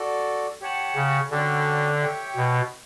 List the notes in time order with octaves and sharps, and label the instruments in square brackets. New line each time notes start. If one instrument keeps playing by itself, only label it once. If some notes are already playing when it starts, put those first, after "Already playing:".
Already playing: [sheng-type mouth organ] F#4 A4 D5
G4 C#5 F#5 A5
[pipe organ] C#3
[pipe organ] D3 [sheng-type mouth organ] C#4 F#4 A4 D5 G5
[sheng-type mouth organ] G4 C#5 E5 G5
[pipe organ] B2